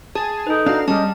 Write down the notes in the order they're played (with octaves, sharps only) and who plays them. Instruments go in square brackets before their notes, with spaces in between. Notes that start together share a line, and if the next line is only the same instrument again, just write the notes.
[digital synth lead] G#4 [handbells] A5 A6
[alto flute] D#4 [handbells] A4 B4
[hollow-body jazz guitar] D4 F#4 [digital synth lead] F5 [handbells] A#5
[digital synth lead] G3 [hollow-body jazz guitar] G#3 C#4 [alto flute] D#5 [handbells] A5 F6